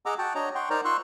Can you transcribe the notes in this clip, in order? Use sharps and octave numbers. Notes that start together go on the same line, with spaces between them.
G#4 D#5 F#5 A#5 D6 E6
F#4 F#5 G5 A5
D4 C#5 D#5 A#5
F#5 G5 C6 C#6
D#4 A#4 C5 D5 A#5
F4 C6 C#6 E6 F#6